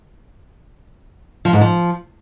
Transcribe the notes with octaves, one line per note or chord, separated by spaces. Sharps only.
F3
G#2
F3